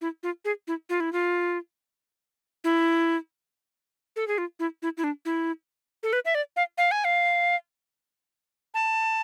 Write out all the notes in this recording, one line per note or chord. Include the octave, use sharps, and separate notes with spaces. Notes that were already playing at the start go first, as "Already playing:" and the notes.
E4
F4
G#4
E4
F4
E4
F4
E4
A4
G#4
F4
E4
E4
E4
D4
E4
A4
B4
E5
D5
F5
F5
G#5
F5
A5